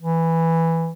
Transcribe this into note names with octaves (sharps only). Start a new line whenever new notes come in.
E3